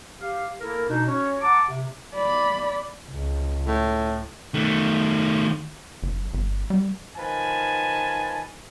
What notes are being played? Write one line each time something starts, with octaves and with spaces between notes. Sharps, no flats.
G4 F5
A#3 E4 A4 A#4
B2 D4 D#4
C#4 F#4 C#5
F#5 A5 A#5 D6
C3
D5 B5
C#2
A2
D#3 A3
F#1
G1
G3
D#3 F3 B4 G#5 A5